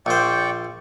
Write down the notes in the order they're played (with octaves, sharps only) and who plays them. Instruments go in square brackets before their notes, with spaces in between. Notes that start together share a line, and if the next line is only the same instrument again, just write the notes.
[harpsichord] A#1 C5 [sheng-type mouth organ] D5 G5 C#6